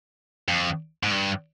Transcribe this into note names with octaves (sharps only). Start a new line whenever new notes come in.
F2
G#2
G2